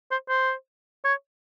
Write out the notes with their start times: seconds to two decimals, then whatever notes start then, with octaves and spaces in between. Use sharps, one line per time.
0.11 C5
0.29 C5
1.05 C#5